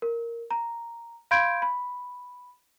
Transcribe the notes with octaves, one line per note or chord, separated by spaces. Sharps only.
A#4
A#5
F5 B5 C6 G6 G#6 D7
B5